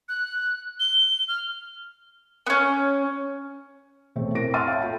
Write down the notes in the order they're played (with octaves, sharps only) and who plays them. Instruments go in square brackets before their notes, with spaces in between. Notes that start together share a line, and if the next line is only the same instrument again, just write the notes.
[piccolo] F#6
G7
F6
[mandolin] B3 C#4
[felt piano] E1 A3 C4 C#5
A2 C4 A#4 A#6 D7
E5 F#5 C6 F6 A6 D#7
C#5 F5 G5 A5
F4 A4 G5 B5